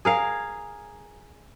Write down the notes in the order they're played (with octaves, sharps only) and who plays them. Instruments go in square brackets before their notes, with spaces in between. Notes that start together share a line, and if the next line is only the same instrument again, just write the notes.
[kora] G#4 A#4 F5